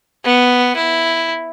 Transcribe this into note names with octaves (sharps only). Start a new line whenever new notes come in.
B3
E4